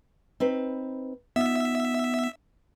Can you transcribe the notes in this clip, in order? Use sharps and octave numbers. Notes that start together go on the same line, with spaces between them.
C4 D#4 B4
B3 D#4 F4 E5